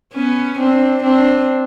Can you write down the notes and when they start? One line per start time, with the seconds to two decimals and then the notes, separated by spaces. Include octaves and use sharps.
0.14 B3 C#4
0.59 C4 D4
1.03 C4 D4